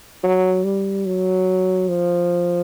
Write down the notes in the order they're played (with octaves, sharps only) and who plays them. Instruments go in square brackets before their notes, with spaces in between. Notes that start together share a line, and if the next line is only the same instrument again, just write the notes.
[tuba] F#3
G3
F#3
F3